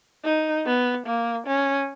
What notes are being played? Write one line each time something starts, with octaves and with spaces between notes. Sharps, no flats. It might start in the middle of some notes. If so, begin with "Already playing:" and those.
D#4
B3
A#3
C#4